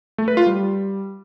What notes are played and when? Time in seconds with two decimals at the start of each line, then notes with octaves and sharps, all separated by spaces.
0.18 A3
0.28 B4
0.37 F4
0.46 G3